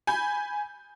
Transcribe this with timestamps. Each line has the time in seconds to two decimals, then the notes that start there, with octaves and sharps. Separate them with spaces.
0.07 G#5 B5 G6